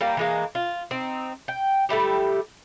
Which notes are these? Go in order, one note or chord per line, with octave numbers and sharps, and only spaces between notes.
G3 A#3
E3 G#3 A#3
F4
C4 D#4
G5
G3 A3 E4 G4